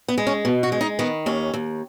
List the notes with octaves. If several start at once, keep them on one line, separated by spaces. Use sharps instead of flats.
B3
G#3
C#4
B2
F#4
G#3
D#4
D#3 B3
D#2 C#4
D#2